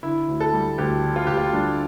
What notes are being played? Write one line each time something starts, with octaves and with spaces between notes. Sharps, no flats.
D3 E4
D2
A4
G3
D2 G4
D3
F4
D2 G4
F4
G3 D4